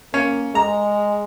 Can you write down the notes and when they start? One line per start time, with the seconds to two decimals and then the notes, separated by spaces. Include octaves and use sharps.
0.14 A#3 C#4
0.55 G#3 A#5